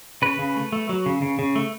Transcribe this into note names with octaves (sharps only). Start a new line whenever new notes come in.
C#3 B4
C#3
A3
A3
F#3
C#3
C#3
C#3
A3